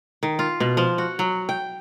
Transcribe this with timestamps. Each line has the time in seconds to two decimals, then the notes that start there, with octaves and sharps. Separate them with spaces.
0.23 D#3
0.39 F4
0.60 B2
0.77 F3
0.98 F#4
1.19 F#3
1.49 G5